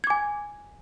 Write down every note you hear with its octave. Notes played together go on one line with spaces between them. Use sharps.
G#5 D6 G#6